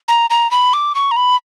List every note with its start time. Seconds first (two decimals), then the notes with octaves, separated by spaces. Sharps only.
0.08 A#5
0.30 A#5
0.51 B5
0.73 D6
0.95 C#6
1.11 A#5
1.17 B5